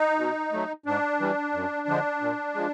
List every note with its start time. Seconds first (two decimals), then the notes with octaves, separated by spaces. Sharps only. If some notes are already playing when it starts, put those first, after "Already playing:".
Already playing: D#4
0.19 B2
0.52 F#3 A3
0.86 G#2 D4
1.20 E3 G3
1.53 F#2
1.88 D3 F3 G#3
2.21 A#2
2.55 F3 G#3